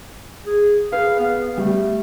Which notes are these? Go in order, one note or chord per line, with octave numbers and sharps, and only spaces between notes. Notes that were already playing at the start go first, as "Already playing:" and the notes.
G#4
G#4 B4 F5
B3
G3 A3